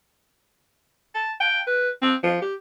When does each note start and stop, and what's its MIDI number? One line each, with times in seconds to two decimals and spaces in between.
1.15 1.32 81
1.40 1.60 79
1.67 1.89 71
2.02 2.15 60
2.23 2.40 53
2.42 2.55 67